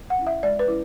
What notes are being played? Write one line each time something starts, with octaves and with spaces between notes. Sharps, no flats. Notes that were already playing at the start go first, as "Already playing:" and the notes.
F#5
C#4 E4
E5
G#3 D5
B4
C#4 E4